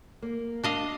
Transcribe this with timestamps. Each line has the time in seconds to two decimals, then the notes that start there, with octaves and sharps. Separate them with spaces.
0.22 A#3
0.63 D4 D#5 F5